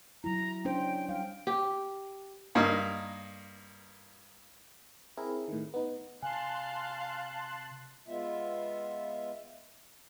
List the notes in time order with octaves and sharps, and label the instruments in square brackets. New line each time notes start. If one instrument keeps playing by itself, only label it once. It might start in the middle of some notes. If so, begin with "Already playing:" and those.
[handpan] F#3 E4 [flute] A#5
[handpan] C#4 D4 C5 [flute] G5
[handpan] G3 F5 [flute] G5
[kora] G4
[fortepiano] G2 A#3 D#4
[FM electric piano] C4 E4 G#4 A#4
A2 D#3
B3 D#4
[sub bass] C3 [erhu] F5 [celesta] G#5 [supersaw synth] A5 C6 F#6
[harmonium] G#3 B3 F4 E5